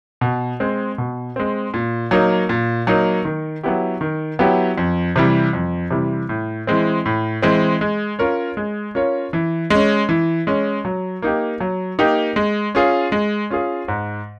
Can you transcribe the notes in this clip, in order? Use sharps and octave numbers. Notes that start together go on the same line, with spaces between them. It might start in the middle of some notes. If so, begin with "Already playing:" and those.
B2
G#3 C4
B2
G#3 C4
A#2
F#3 A#3 D#4
A#2
F#3 A#3 D#4
D#3
F#3 B3 E4 G4
D#3
F#3 B3 E4 G4
F2
C3 E3 G3
F2
C3 E3 G3
A2
E3 G#3 C4
A2
E3 G#3 C4
G#3
C#4 F4 A#4 C#5
G#3
C#4 F4 A#4 C#5
E3
G#3 C#4
E3
G#3 C#4
F#3
A#3 D#4 G4
F#3
A#3 D#4 G4
G#3
C#4 F4 G#4
G#3
C#4 F4 G#4
G#2